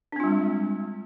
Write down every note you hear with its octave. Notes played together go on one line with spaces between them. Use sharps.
G3 G#3 C4 D4 F4